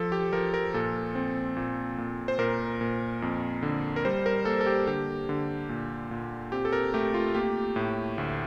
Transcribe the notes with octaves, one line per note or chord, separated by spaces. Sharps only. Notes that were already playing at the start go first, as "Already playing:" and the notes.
Already playing: F3 A4
G4
F3 A#4
A#4
A#2 A4
C4
A#2
A#2
C5
A#2 A#4
A#2
F2
D3
A#4
G3 C5
A#4
A#3 A4
A4
G4
D3 G4
D3
A#2
A#2
C4 G4
A4
A#4
A3 G4
F4
A#3 G4
A2
D2